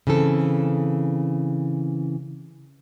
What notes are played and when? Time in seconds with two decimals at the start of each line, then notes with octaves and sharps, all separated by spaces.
0.07 C#3 E3 C4 A4